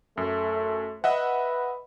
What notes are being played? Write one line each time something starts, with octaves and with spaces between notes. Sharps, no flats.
F#2 A3
B4 D#5 E5 F#5